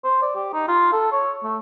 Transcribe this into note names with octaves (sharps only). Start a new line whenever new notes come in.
C5
D5
G4
D#4
F4
A4
C#5
A3